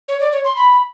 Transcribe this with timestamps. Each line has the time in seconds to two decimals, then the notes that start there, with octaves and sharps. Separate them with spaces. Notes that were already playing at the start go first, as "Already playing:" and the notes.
0.08 C#5
0.20 D5
0.32 C#5
0.44 C6
0.56 B5